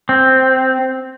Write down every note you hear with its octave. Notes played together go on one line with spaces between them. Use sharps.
C4